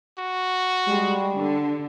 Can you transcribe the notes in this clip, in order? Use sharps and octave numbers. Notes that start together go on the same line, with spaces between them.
F#4
G3 G#3
D3